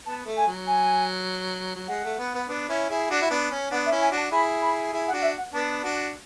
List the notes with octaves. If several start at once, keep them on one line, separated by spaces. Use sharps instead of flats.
B3 A5
A3
G#5
F#3
G#5
F#3
G#3 F#5
A3
B3
B3
B3 D4
C#4 E4
E4 G#4
D4 F#4
E4
B3 D4
C#4
B3 D4 F#5
E5
C#4 E4
G#5
D4 F#4
A5
E4 G#4 B5
B5
E4 G#4
F#5
D4 F#4
F#5
E5
F#5
B3 D4 A5
D4 F#4